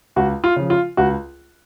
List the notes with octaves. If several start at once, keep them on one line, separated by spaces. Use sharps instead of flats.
C#2 F#4
F4
C#3 F3
F4
C#2 F#4